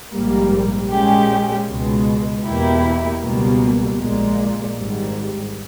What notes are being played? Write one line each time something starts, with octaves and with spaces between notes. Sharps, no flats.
A#1 G#2 G3 A#3
A#2 G#3 C#4 G4
C#2 B2 G#3
E2 B2 A#3 E4 G4
C#2 B2 G3 A#3
A#1 A#2 G#3
G#1 G#2 G3